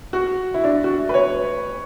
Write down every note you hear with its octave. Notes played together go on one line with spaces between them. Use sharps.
F#4
E4
D4
F#4
B4
C#5